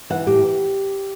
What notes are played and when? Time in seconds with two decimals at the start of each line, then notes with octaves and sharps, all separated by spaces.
0.10 E3 F#5
0.26 A2 G4
0.43 E3